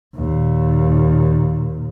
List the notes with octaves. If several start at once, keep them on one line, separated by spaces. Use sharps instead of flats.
D#2 A#2